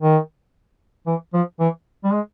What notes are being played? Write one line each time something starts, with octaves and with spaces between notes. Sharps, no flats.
D#3
E3
F3
E3
G3
G#3